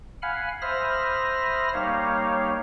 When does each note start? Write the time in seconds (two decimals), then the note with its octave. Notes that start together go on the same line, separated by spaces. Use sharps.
0.22 F5 F#5 G#5 B5 F6
0.62 C5 E5 B5 D#6 F6 A#6
1.74 G3 A#3 D#4 C#5 F5